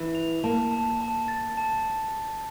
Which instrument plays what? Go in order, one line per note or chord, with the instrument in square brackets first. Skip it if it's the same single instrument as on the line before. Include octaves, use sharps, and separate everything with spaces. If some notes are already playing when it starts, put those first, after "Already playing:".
Already playing: [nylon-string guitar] E3
[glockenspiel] F7
[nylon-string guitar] A#3 [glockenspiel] A5
[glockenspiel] A5
A5
A6
A5